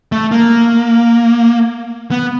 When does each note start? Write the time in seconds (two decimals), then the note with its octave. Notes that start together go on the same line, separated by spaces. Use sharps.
0.12 A3
0.32 A#3
2.11 B3